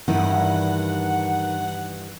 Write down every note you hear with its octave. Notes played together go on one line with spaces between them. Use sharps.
G2 D#3 E3 D#4 E4 F#5